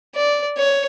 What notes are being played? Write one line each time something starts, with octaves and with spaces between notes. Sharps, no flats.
D5
C#5